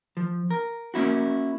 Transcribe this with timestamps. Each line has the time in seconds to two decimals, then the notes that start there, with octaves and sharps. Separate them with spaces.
0.17 F3
0.51 A#4
0.94 A#3 C#4 E4 F#4